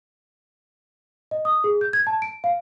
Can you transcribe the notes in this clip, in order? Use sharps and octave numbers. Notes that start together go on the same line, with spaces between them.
D#5
D#6
G#4
G6
G#6
A5
D7
F5